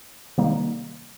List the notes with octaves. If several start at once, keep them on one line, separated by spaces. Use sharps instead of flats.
C3 D#3 G3 A#3 D#4